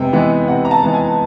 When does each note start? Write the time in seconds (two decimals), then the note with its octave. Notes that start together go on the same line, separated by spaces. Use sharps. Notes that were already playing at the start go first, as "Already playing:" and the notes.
Already playing: C3 G#3 B3 G5
0.13 E3 G#3 B3
0.48 C3 F#5
0.65 A#5
0.71 A5
0.82 E3 G#3 B3
0.94 G#5